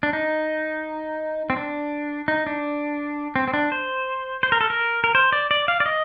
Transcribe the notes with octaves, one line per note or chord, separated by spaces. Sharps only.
D4
D#4
C4
D4
D#4
D4
C4
C4
D4
C5
C5
A#4
A4
A#4
A#4
C5
D5
D5
F5
D5
D#5